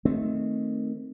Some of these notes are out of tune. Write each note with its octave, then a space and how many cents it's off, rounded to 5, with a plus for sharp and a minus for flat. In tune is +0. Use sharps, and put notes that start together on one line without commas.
D#3 +0 A3 +0 C4 +0